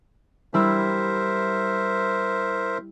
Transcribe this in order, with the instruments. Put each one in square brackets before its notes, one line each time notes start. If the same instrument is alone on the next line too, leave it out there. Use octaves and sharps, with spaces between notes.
[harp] G3 E4 [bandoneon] A#4 C5 E5